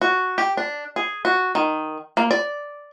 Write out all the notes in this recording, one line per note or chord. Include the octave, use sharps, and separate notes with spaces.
F#4
G4
D4
G#4
F#4
D#3
A#3
D5